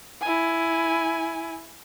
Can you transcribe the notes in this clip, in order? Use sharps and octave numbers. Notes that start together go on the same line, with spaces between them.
E4 G#5